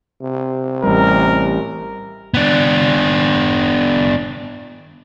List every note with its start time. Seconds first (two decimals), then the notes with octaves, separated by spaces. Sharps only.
0.22 C3
0.83 A1 G3 A#4
2.34 B3 D4